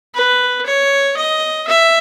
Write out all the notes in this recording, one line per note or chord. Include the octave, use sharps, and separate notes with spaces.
B4
C#5
D#5
E5